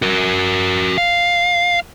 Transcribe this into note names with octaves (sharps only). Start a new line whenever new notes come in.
F#4 A#4
F5